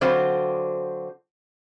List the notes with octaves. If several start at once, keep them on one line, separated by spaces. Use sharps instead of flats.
D3 F#3 C4 F4 C5